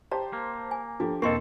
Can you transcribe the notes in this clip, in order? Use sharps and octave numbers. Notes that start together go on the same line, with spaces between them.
G4 C5 A5 A#5
A#3
G#5
F3 D4 G4 A4
E2 B2 A#3 C4 A4 D#5 C6 C#6